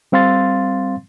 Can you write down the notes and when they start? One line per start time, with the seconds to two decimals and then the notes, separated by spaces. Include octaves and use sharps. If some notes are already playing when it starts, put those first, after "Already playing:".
0.12 G3 C4 F5 C6 A6